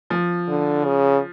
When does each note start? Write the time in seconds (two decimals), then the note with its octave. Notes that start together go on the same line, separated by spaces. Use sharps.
0.10 F3
0.49 D3
0.85 C#3